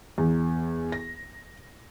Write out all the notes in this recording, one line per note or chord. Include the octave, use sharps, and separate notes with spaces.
E2
A#6